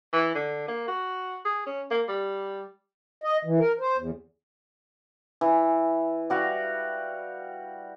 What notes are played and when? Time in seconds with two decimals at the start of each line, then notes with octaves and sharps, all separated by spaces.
0.13 E3
0.35 D3
0.68 A#3
0.88 F#4
1.45 G#4
1.67 C#4
1.91 A#3
2.08 G3
3.24 D#5
3.45 E3
3.59 A#4
3.80 C5
3.97 E2
5.41 E3
6.30 G3 F#4 F5